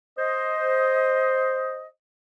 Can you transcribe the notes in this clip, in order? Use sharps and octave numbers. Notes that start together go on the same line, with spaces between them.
C5 D#5